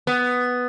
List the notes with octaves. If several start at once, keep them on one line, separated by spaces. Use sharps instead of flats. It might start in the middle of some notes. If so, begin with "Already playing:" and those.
B3